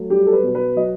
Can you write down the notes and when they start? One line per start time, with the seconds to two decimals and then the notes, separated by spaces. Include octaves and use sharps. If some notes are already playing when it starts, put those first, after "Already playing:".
Already playing: F#3 A3
0.10 G3 G4
0.27 A4
0.33 B4
0.43 B2
0.55 B4
0.76 F#3 D#5